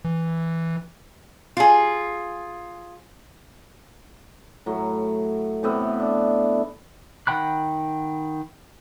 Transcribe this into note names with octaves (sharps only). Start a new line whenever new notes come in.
E3
F4 G#4
A2 F#3
A2 C3 B3 E5
D4
D#3 F#5 G5 B5 F#6